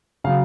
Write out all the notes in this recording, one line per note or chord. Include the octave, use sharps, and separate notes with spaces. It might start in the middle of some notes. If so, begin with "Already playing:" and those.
C#3 F#3 F5